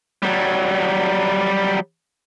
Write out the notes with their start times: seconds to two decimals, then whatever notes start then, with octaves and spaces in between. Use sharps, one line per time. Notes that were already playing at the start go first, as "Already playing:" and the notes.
0.23 F#3 G3